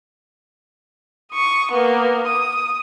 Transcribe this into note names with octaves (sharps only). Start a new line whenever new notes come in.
C#6 D#6
A#3 B3
D#6